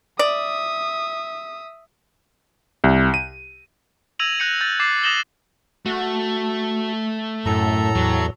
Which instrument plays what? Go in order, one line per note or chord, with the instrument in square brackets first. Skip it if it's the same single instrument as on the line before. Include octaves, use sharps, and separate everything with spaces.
[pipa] D5 [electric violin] E5 D#6
[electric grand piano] C2
D#7
[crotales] E6 G#6 A#6 D#7 F7 F#7
F#6 G6 A#6 C#7 F7
G6 A6
D6 A6 C7
D#6 G6 A#6 E7 F#7 G7
[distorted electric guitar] A3 [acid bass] F#4
[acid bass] F#2 [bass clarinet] A2 [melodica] A4 A#5
[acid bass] E2 [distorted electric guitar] F#3